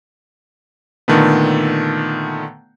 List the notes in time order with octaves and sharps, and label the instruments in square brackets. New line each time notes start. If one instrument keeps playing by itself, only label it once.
[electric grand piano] A#2 D3 D#3 A3 B3